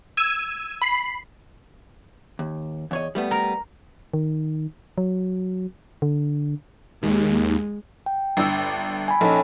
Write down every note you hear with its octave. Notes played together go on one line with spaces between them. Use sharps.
E6 G#6 D#7
B5 C7
D#2
E2 C#5 D#5
G3 A3 B3
A#4
D#3
F#3
D3
D#2 G#3
G5
G1 D4 E6
G#5 B5
A#1 C#4 D#4 A4 C#5 A5